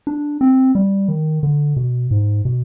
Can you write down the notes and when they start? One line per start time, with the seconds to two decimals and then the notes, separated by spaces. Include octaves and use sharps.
0.07 D4
0.41 C4
0.75 G3
1.08 D#3
1.43 D3
1.76 B2
2.11 G#2
2.45 B2